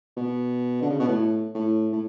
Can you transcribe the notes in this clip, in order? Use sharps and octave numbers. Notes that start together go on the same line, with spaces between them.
B2
D3
C#3
B2
A2
A2
A2